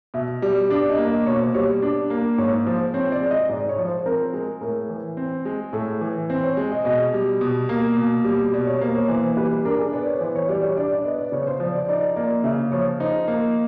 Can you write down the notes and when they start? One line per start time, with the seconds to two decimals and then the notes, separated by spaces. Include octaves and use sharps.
0.14 B2 E5
0.42 G3 D5
0.70 D4 D5
0.89 D#5
0.98 A#3
1.07 D#5
1.26 B2 C#5
1.40 C5
1.54 G3 C#5
1.82 D4
2.10 A#3
2.38 G#2 C#5
2.66 F3 C5
2.94 C4 C#5
3.12 D5
3.22 G#3
3.31 D#5
3.49 G#2 D5
3.69 C#5
3.78 F3
3.88 C5
4.06 C4 A#4
4.33 G#3 A#4
4.61 A2 A#4
4.90 E3
5.17 C4
5.45 G#3
5.73 A2 A4
6.01 E3
6.30 C4 C5
6.44 C#5
6.57 G#3
6.72 D#5
6.85 B2 D#5
7.14 G3
7.41 B2
7.69 A#3
7.97 B2
8.24 G3
8.53 B2 D5
8.67 C#5
8.81 A#3 C5
8.95 C#5
9.08 E3 C5
9.37 G3 B4
9.65 D4 A#4
9.78 G#4
9.92 B3 D5
10.07 C#5
10.21 E3 C5
10.35 C#5
10.49 G3 D5
10.62 C#5
10.77 D4 D5
10.91 D5
11.04 B3 D#5
11.19 D5
11.32 C#3 C#5
11.47 C5
11.60 F3 D5
11.75 D5
11.89 D#4 D5
12.16 A#3 D5
12.44 C#3 E5
12.72 F3 C#5
13.00 D#4 C5
13.28 A#3